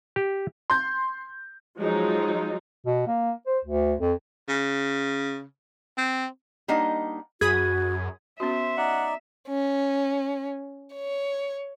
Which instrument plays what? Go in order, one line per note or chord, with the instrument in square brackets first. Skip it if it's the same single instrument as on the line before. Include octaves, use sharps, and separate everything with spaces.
[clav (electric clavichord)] G4
[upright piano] C6 G6
[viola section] F3 F#3 G#3 D#4 F4
[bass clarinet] B2
A#3
C5
D2
F2
[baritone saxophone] C#3
C4
[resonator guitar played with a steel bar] G3 A#3 D4 D#4 D#5 F#5
[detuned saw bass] F#2 [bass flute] F#4 [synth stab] G#4 B5 D#6 [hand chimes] G#6
[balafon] B3 C#4 F#4 [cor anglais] C5 [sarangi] E5
[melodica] D#4 D5 [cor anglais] F#5
[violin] C#4
C#5